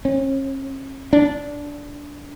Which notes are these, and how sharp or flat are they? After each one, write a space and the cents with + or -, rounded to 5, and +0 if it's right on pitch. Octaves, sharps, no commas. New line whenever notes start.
C#4 -40
D4 -15